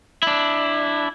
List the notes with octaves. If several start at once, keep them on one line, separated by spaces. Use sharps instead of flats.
D4 E4